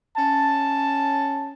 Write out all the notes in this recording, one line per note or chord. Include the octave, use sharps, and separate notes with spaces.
C#4 A5